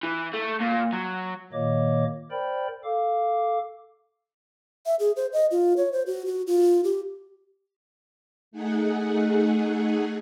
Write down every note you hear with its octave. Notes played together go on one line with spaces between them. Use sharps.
E3
A3
A#2
F#3
A#2 D#3 A#3 C#5 D#5 D6
A#4 C5 D5 G5 B5
A4 F5 D6
E5
G#4
C5
D#5
F4
C#5
C5
F#4
F#4
F4
G4
A3 D#4 G#4 F#5